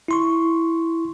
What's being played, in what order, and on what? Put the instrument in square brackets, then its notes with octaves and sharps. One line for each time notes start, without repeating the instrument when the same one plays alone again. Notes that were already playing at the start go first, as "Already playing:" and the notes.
[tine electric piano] E4 C6 C#6